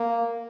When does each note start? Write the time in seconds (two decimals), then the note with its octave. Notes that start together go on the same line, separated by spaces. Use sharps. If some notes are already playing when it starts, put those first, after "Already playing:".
Already playing: A#3